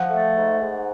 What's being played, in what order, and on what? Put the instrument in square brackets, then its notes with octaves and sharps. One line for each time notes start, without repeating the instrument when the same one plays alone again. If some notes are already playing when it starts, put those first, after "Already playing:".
Already playing: [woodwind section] F3 [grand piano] F#5
[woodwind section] A3
G#2
G#2